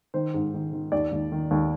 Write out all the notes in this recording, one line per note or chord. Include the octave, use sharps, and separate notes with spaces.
D#3 C5
G#2
D#3
D#3
D#2 D5
D#2
D#3
D#2